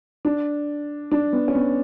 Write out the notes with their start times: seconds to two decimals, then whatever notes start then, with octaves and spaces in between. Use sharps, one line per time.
0.25 D4
1.12 D4
1.33 B3
1.48 C#4
1.55 B3